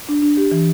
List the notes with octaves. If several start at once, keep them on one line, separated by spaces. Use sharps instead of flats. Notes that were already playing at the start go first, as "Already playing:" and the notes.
D4
D4
G4
E3